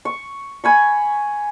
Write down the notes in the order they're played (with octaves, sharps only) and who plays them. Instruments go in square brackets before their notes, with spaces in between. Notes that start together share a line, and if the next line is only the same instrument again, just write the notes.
[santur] C#6
G#5 B5 C#6